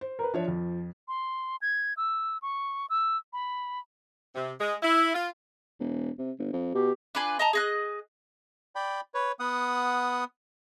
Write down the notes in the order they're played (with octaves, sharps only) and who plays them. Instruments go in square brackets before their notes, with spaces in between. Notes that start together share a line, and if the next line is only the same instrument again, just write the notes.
[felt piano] C5
[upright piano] A#4 B4
[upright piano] F3 [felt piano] D4 C#5 E5
[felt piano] F2
[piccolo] C6
G#6
E6
C#6
E6
B5
[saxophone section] C3
G#3
E4
F4
[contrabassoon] E1
C3
G1
F2
[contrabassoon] B2 [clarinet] G4
[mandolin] D4 F4 B4 G#5
D#5 A5 A#5
G#4 D#5 F#6
[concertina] D5 G5 B5
B4 C#5
B3 F#5 D#6